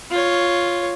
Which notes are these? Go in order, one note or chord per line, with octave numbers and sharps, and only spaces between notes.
F4 C#5